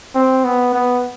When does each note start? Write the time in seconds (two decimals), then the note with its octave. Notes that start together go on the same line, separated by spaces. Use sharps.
0.15 C4
0.44 B3
0.74 B3